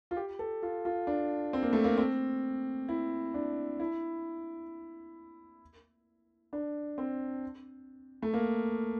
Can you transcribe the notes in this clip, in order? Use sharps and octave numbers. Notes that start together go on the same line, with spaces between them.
F4
G4
A4
F4
F4
D4
C4
A#3
A3
A#3
C4
E4
D4
E4
D4
C4
A3
A#3